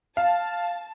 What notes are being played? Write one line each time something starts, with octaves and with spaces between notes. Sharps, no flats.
F5 A5